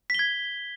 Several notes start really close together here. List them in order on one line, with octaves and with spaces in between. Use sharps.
B6 G7 G#6